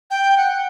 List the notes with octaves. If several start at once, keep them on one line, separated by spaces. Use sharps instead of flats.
G5
F#5